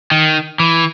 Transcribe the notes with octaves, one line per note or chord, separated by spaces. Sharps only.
D#3
E3